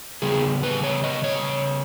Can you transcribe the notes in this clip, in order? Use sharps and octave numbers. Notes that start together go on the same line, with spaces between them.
C#3 G3 B3 G#4
B4
C#5
D#5
C#5